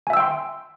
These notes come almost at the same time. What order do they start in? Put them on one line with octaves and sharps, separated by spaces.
G#5 E5 E6 G5 C6